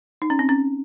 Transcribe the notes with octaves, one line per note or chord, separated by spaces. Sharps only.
D#4
C#4
C4
C#4